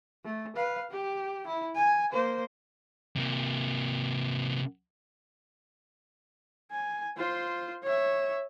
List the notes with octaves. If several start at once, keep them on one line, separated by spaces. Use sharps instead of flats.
A3
B4 F5
G4
E4
G#5
A#3 C5
C3 A#3
G#5
F4 C5
C#5 E5